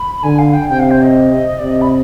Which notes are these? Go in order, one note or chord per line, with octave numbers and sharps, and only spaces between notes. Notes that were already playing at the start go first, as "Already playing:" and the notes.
Already playing: B5
D3 G#5
F5
G5
C3 G5
F5
C5
D#5
C3 D5
D#5
B5